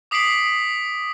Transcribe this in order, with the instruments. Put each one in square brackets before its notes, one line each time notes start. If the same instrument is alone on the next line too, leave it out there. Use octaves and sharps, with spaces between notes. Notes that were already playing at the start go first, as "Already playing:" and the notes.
[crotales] D6 D#6 B6 C7 D7 F#7